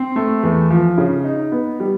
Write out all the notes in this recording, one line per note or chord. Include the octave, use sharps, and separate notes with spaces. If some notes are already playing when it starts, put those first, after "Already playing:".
Already playing: C4
A3
E2
F3
C#3
D#4
B3
G3